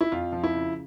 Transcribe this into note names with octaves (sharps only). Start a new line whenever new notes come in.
E4
F2 F4
F3
E4
C#3